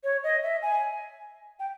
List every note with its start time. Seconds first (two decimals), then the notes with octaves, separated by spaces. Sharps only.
0.04 C#5
0.24 D#5
0.43 E5
0.62 G#5
1.59 G5